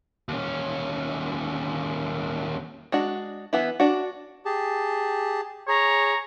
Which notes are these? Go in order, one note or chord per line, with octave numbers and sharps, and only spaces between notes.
D#2 C#4
G#3 D4 F#4
E3 B3 E4
D4 F#4
G4 G#4 A5
G#4 C#5 A#5